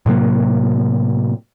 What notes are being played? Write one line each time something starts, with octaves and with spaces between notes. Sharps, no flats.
A2 C3 F#3 A#3